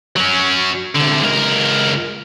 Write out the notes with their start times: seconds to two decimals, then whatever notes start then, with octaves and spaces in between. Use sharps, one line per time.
0.16 F#3 C#4
0.95 C2 D3
1.22 C#2 A#4